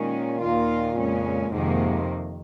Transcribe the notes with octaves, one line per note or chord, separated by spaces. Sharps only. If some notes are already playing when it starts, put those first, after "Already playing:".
Already playing: A#2 D#3 G#3 C#4
D#2 D#3 A#3 F4
F2 C#3 G#3 C#4
F2 G#2 C3 D#3 A#3